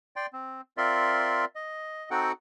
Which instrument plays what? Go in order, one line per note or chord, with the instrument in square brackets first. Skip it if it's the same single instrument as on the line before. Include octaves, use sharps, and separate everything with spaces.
[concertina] D5 G5 C6
C4
C4 F4 A#4 D5 E5 C6
D#5
C4 D#4 F#4 A4 F#5 G5